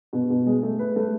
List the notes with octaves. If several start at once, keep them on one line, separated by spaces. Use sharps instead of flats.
B2
B2
G#3
A3
B4
A3